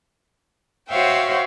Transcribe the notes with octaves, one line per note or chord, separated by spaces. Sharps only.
F#4 C5 C#5 E5 F5 G5